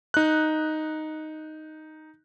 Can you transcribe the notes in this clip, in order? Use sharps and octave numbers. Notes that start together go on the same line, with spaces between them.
D#4 F#6